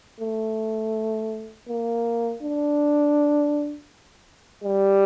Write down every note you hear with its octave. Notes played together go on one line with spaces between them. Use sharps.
A3
A#3
D4
G3